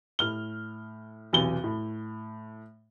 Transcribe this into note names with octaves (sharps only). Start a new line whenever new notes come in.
A2 F6 G7
B1 E2 C3 G7
A2